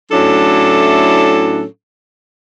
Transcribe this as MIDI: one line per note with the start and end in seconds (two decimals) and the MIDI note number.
0.11 1.63 45
0.11 1.63 54
0.11 1.63 61
0.11 1.63 62
0.11 1.63 64
0.11 1.63 69